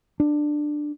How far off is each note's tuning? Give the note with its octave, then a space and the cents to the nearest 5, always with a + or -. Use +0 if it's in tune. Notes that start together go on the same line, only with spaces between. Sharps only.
D4 +15